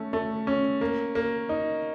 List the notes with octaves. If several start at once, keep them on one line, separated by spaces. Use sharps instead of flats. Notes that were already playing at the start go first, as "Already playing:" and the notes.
Already playing: A3 C#4
A3
C#4
A#3
A#3
D#4